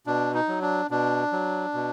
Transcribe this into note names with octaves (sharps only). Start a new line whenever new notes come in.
B2 D4
D#4
F#3
D4
B2 D4
F#3
B2